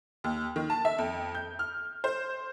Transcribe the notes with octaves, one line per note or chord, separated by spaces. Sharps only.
D#2
D#3
A5
E5
F2
G6
F6
C5